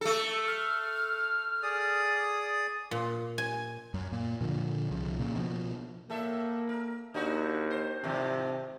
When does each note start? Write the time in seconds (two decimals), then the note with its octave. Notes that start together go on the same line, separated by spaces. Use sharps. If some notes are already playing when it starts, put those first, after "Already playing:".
0.01 A3 A4
0.47 F6
1.63 G#4 D5 D#6
2.91 A#2
3.38 G#5
3.94 F#2
4.12 A#2
4.41 A#2 D3 F3
4.91 C2 C#3 F3
5.18 A#2 C#3
5.35 B2 F3
6.10 A2 A#3 A4 E5
6.69 A#4
7.14 D#2 D4 D#4 F#4
7.70 C5
8.04 G#2 C3 D#3 F3